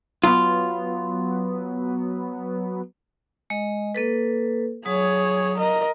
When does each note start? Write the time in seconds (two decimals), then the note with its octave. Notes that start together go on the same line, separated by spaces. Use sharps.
0.24 F#3 B3 F4
3.50 G#3 D#5
3.95 A#3 A4 B4
4.85 F#3 G#4 C#5 D#6
5.58 A#4 D#5